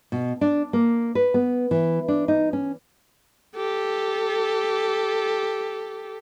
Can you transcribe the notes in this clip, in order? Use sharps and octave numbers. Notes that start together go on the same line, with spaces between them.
B2
D4
A#3
B4
B3
E3
D4
D#4
C#4
G4 A4